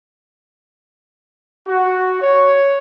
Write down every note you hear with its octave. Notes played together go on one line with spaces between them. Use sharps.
F#4
C#5